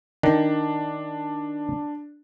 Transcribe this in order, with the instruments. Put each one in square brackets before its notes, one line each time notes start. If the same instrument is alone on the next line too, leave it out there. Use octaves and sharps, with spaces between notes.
[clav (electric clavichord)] D#3 [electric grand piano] D4